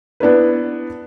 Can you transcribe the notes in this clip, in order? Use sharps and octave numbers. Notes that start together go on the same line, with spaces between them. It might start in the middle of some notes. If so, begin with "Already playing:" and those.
B3 D4 E4 B4